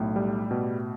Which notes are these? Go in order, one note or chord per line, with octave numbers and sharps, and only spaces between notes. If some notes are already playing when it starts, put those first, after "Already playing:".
Already playing: B1 A2
G3
B2